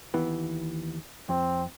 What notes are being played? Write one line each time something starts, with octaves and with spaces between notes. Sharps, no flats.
D#2 E3 B3
F2 C4